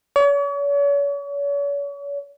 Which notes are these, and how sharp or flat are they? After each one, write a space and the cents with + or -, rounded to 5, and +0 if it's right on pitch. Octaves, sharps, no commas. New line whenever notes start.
C#5 +40